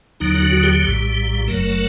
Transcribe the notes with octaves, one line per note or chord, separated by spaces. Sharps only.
D#2 D3 F#3 D#4
D#4
F#4
F#4
G4
A#1 A2 G3
F#1 F#2 F#3 A3 A#4